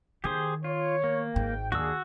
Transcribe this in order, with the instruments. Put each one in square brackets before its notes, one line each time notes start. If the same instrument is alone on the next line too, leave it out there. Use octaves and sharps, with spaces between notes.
[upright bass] D#3 B3 [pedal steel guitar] G4 G#4 C5
[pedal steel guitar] F4 [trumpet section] C#5
[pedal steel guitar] A#3
[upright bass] G#1 G#2 [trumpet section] G5
[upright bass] D#2 [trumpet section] A#3 D4 G#4 [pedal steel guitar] F#4 E6